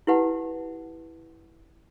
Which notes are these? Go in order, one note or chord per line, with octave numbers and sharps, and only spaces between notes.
E4 G4 B4 F#5 A5